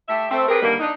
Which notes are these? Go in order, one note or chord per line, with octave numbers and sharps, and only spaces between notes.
A3 G4 E5
A3 C4
C4 G4 G#4 A#4 B4
D3 D#3 G3 A#3
D4 D#4